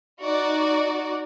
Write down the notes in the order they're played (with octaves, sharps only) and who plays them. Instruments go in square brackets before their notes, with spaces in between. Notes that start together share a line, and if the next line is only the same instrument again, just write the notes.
[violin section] D#4 F#4 D5